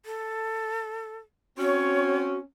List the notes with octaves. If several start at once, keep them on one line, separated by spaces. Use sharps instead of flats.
A4
C4 C#4 F#4 C#5